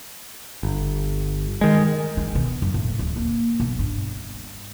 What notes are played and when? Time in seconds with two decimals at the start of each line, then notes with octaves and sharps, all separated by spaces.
0.63 G1
1.61 D#3 G#3
2.17 D#3
2.35 B2
2.62 F#2
2.74 A2
2.99 D1
3.16 A#3
3.60 B1
3.79 G2